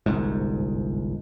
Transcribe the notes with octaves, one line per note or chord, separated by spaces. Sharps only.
G1 C2 G#2